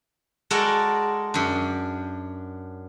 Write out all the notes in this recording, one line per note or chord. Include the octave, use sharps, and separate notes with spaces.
G#3 F#4 A4 A#4 D5
F#2 D4